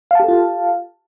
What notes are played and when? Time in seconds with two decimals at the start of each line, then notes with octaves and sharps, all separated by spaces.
0.11 F5
0.15 A5
0.20 G4
0.24 A4
0.28 F4